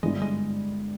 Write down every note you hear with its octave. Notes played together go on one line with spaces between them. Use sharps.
G2 D3 G3 G#3 B3 E4
G#3